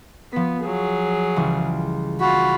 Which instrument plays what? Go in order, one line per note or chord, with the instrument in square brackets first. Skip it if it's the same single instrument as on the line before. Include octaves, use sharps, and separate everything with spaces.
[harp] F3 B6 [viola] B3
[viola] F#3 G#4
[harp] C#2 E3 G3
[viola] F4 B5 [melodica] F#4